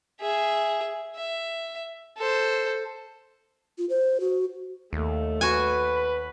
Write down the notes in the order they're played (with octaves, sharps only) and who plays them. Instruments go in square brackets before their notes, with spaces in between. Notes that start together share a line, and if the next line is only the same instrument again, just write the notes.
[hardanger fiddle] G#4 E5
E5
A4 C5
[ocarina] F4
C5
F#4
[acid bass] D#2 [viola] A3
[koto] F#4 G#5 [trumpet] B4
[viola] B5